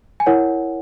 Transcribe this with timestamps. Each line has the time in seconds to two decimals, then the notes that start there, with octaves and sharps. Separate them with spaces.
0.20 G#5
0.26 E4 A#4 C#5 F#5